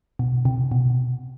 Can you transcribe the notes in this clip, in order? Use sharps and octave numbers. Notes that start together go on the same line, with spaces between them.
B2
C3
B2